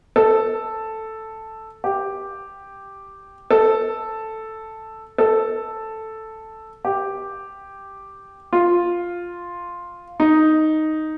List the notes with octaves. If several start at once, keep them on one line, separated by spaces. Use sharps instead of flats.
A4
G4
A4
A4
G4
F4
D#4